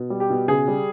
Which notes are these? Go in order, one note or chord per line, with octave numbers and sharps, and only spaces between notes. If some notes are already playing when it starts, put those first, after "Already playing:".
Already playing: B2
G3
G4
B2
C#3 G#4
G3